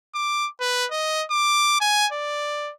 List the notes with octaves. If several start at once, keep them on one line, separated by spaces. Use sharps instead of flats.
D6
B4
D#5
D6
G#5
D5